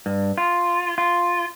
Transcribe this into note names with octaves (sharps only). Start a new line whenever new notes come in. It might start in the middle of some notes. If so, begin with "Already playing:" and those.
G2
F4
F4